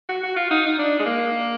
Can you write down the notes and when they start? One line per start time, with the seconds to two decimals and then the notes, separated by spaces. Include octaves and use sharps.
0.09 F#4
0.23 F#4
0.36 F4
0.51 D#4
0.66 D#4
0.79 D4
0.99 G#3
1.06 A#3